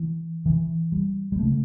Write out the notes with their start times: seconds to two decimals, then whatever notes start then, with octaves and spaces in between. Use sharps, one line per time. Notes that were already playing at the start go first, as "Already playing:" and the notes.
Already playing: E3
0.46 E3
0.92 G3
1.32 G3
1.39 C#3 A3